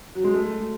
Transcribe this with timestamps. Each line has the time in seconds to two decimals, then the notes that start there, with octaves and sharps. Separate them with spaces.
0.15 F#3
0.24 G#3
0.34 A3